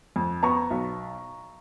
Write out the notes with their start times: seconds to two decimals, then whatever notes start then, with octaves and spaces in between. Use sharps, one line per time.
0.16 F2
0.43 B3 A#5 C#6
0.70 B1